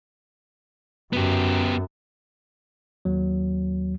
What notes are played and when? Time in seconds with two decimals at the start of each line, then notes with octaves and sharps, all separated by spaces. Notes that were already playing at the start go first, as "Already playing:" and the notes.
1.13 F#2 B3 G4
3.05 D#2 F#3